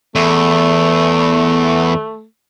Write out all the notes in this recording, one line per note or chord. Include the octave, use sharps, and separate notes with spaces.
E2 A3